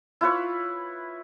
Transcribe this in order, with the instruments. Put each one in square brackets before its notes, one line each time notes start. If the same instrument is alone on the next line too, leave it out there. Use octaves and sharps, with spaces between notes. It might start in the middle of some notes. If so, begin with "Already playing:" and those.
[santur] E4 F4 B4 C#5